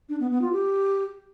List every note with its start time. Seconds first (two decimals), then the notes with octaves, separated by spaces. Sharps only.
0.09 D4
0.20 B3
0.31 B3
0.41 F4
0.52 G4